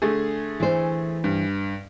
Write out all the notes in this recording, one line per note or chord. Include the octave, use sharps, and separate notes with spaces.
D3 A3 G#4
E3 C5
G2